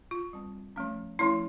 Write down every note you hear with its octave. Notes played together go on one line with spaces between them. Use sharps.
F4
G3 C4
F3 A3 C#4
F3 A3 C#4 E4